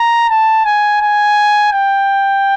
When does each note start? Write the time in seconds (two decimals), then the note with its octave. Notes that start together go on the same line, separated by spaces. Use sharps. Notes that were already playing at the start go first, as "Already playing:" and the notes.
Already playing: A#5
0.29 A5
0.65 G#5
1.01 G#5
1.71 G5